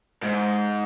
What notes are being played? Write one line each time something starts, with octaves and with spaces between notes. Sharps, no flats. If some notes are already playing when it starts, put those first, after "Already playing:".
G#2